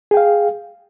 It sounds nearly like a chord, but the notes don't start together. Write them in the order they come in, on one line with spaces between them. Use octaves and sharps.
G#4 G5 F5